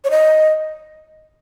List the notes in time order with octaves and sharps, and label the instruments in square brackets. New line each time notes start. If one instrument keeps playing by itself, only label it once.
[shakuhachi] C#5
D#5